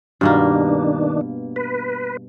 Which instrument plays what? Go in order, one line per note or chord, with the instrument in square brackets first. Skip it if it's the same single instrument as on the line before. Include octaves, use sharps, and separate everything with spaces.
[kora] G2 B2 A#3 [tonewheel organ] D#3 D4
[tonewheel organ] B4